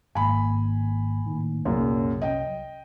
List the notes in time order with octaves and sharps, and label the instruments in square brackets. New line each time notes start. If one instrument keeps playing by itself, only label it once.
[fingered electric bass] G#1 G#2 A#3 [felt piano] G#5 B5
[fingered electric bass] A2 D#3 A#3
[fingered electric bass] C2 F#3 [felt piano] F#2 A#2 C#3
[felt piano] D#5 G5